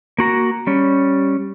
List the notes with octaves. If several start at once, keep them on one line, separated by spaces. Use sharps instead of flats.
A#3 F#4 A#5
G3 C#4